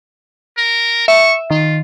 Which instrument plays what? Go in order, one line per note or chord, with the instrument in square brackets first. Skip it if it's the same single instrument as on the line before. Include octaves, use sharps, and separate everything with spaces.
[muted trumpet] A#4
[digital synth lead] E5 [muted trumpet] C#6
[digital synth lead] D#3 [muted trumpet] F4